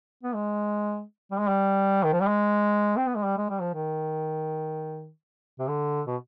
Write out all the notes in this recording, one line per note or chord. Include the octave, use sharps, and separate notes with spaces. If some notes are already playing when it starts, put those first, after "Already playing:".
B3
G#3
G3
G#3
G3
D#3
F3
G3
G#3
C4
B3
G#3
G3
G#3
G3
F3
D#3
C3
D3
B2